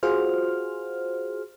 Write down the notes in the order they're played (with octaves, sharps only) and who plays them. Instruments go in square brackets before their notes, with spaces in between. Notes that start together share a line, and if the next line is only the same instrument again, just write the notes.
[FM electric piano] F4 F#4 G#4 C5 F6